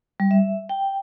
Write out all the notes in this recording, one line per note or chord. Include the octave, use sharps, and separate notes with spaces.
G3
E5
G5